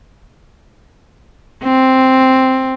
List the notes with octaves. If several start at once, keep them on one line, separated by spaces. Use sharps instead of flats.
C4